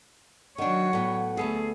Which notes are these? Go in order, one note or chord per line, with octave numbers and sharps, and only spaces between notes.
D#3 F#3 D4 C#5 F#5
A2 B3
D2 A3 B3 G#4 A4